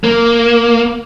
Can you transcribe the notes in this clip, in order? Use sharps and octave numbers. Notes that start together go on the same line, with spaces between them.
A#3